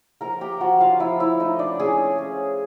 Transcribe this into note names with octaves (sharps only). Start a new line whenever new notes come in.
F3 A#4 A#5
G4 G5
F3 F#4 F#5
F4 F5
F3 E4 E5
E4 E5
A3 D#4 D#5
D4 D5
C#4 G#4 G#5
C#4